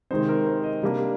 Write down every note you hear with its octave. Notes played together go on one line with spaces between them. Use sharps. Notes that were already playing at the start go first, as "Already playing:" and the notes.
C3 D#3 G#3 C4 D#4 C5
A#4
C5
D#5
C3 G3 A#3 D4